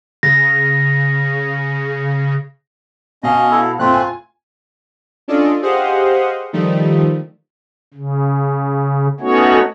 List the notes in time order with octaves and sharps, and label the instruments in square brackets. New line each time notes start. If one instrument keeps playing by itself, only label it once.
[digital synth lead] C#3 [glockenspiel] A#6
[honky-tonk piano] B2 F5 A5 [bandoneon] C#4 D#5
[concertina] E4 A4
[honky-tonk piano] F2 A#2 [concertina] A3 C4 F#6 [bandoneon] F4
[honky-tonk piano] G#5
[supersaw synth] C#4 D4 F4 A4 D5 D#5
G4 G#4 C5 D#5 F5 F#5
D#3 F3 G3 A3 D#4
[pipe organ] C#3
A3 B3 C#4 D#4 F#4 C#5